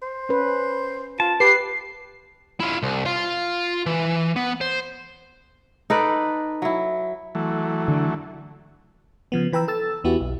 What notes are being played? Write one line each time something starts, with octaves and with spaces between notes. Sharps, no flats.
C5
C#4 B4
F4 A5
G4 B4 C7
E4 F4
C2
F4 F5
E3
B3
C5
D#4 A4 B4 D5
F#3 E4
E3 F#3 A3
D3
C#3 F3 B3
E3 B4 G5 A#5 E6
A4 E6 A6
E2 B3 E4 F#4 G4
B1